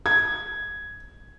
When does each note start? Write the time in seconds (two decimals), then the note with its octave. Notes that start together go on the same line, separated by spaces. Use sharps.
0.06 G#6